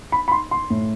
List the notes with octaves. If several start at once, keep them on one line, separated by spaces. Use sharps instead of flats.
B5
B5
C6
C6
A2